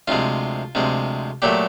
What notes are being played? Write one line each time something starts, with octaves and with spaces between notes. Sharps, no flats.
D2 C3 F3 G#3 F4
D2 C3 F3 G#3
A#2 F#3 A3 G4